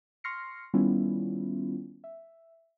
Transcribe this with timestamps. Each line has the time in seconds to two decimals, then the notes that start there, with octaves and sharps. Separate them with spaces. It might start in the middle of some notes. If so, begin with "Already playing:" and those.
0.24 C6 C#6 F6 A#6 C7 C#7
0.74 D#3 G3 B3 C#4 E4 F4
2.04 E5